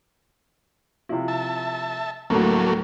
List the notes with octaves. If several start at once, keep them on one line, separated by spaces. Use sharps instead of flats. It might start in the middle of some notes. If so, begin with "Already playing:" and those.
C3 F3 E4
E5 A5
D2 A2 F#3 A3 A#3